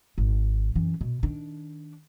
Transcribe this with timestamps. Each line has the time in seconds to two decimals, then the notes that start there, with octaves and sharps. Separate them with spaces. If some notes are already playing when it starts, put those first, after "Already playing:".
0.18 G#1
0.75 F#2 E3
1.01 B2
1.23 D#3 D4